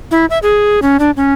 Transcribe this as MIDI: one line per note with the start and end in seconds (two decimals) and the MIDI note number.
0.11 0.26 64
0.30 0.38 76
0.43 0.80 68
0.82 0.97 61
1.00 1.11 62
1.17 1.34 61